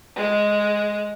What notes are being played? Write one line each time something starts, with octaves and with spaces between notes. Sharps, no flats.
G#3